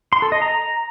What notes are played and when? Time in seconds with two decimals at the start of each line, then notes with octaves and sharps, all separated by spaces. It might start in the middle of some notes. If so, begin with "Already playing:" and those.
0.13 C6
0.22 A4
0.32 D#5
0.42 A#5